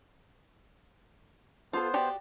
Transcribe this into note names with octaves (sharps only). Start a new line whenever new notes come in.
B3 F4 A4 C5
F#4 G4 D5